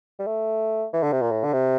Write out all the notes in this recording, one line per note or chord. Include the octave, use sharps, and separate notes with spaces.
G3
A3
E3
D3
C3
A#2
A2
D3
C3